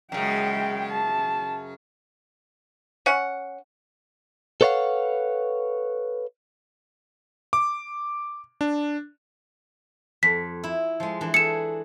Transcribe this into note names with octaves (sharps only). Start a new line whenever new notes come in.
F#2 C#3 G#3 G5
A5
C#4 F#5
A4 B4 C#5 D5 F5 F#5
D6
D4
F2 B6
E4
F3 G#3
E3 D4
G#4 A4 E5 C#7 E7